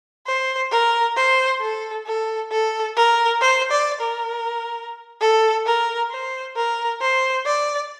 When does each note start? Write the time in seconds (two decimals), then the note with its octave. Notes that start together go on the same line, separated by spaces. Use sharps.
0.26 C5
0.71 A#4
1.16 C5
1.61 A4
2.06 A4
2.51 A4
2.96 A#4
3.41 C5
3.71 D5
4.01 A#4
5.21 A4
5.66 A#4
6.11 C5
6.56 A#4
7.01 C5
7.46 D5